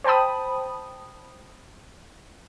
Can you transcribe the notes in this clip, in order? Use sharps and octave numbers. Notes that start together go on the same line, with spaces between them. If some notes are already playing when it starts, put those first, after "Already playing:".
C5 G5 A5 B5 D#6